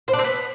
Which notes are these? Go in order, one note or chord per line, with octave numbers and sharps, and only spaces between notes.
C5
D4
C4
B3